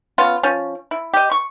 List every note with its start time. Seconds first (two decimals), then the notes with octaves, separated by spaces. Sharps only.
0.18 B3 C#4 F4
0.43 F3 C#4
0.91 E4
1.14 G4 D#5
1.32 C#6